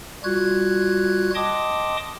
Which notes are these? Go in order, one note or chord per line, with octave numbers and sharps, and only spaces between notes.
G3 F4 F#4 F#6 G#6
D#5 G5 A5 C6 D6 D#6